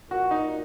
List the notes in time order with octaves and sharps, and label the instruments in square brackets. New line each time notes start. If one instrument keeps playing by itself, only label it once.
[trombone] A#2 [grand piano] F#4
[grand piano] D#4